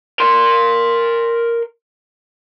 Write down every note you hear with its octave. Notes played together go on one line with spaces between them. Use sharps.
A#4 C6